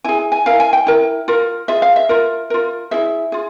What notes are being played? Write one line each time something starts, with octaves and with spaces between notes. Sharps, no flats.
E4 G#4 G#5
G#5
E4 A#4 F5
G#5
G5
E4 A#4
F4 A#4
F4 G#4 E5
F5
E5
F4 A#4
F4 A#4
E4 G#4 E5
F4 G#4